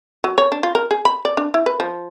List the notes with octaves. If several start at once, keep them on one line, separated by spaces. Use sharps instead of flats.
F#3
C#5
D4
F4
A#4
G#4
B5
D5
D4
E4
B4
F3